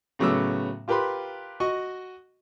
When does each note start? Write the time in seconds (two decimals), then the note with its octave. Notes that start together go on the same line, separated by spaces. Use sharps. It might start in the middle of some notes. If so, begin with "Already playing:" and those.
0.19 A2 C#3 F#3 B3 D6 E6
0.88 F4 G4 A#4 B4 B5 C6
1.60 F#4 D#5 C#6